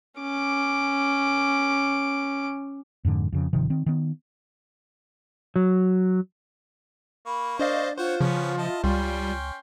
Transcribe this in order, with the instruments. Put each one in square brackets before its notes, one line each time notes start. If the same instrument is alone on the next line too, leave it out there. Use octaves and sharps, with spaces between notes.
[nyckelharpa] C#4 D6
[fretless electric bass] F2 G#2 D3
F2 C#3
G1 C3 D#3 F3
D#3 C4
D#3 B3
[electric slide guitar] F#3
[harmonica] A#3 C#6 [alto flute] B5
[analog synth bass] D4 [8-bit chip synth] C5 D#5 F5 [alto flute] D5
[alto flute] F4 [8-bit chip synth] C5 [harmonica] C#5 F#5
[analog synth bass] C#3 [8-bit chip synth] F3 [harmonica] B3 C#4 C#5
[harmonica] E4 D#5 A5
[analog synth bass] C#2 [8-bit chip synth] G3 [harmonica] C#4 G5 C6